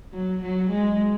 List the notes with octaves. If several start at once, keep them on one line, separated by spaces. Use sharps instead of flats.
F#3
F#3
G#3